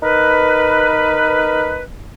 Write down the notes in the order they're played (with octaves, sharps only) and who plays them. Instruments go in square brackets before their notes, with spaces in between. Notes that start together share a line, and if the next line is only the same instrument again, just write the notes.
[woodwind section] D#4 A#4 B4